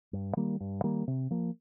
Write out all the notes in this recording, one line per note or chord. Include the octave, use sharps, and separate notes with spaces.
G2
D#3 G3 A#3
G2
D#3 G3 A#3
C3
F3 A#3